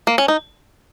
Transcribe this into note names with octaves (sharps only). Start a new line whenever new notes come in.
A#3
C#4
D#4